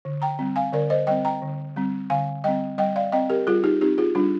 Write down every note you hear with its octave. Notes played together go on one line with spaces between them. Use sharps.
D3
G5 A#5
G3 C4
F5 G#5
D3 A#4 D5
C5 D#5
G3 C4 D#5 G5
G5 A#5
D3
G3 C4
D3 F5 G#5
G3 C4 D#5 G5
G3 D#5 G5
D5 F5
C4 D#5 G5
G4 A#4
G3 F4 G#4
D#4 G4
C4 D#4 G4
F4 G#4
G3 D4 F4